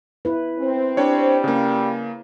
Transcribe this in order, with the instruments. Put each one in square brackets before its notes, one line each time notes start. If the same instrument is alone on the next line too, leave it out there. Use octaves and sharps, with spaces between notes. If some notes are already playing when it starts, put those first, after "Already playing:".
[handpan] E4 B4
[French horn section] C4
[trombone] G3 [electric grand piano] D4 C#5
[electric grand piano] C#3 A#3